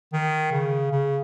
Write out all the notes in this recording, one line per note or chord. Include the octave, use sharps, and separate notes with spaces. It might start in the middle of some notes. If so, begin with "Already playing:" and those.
D#3
C#3
C#3